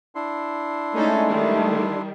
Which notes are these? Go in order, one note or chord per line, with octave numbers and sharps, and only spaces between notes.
D4 E4 C6
G#3 A3 C#4 D#4 A4
D#3 G3